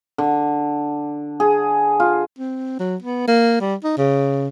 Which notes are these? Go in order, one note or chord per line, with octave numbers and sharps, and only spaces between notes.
D3
G#4
F4
C4
F#3
B3
A#3
G3
D#4
C#3